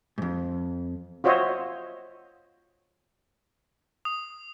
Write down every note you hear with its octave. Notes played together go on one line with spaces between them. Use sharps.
F2 G#2
F4 F#4 C5 C#5 D#5 E5
D#6